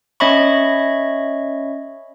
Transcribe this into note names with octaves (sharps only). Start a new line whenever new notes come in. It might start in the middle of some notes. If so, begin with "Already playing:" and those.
C#4 C#5 D#5 E5 B5 C#6